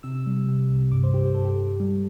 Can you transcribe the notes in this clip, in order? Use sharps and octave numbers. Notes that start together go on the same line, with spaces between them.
C3 E6
G3
C3
C2
G2 D6
C5
G2 G4
C5
G2 A4
G4
G2 A4
G3